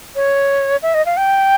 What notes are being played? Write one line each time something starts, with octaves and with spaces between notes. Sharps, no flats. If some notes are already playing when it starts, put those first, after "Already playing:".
C#5
E5
D#5
F5
G5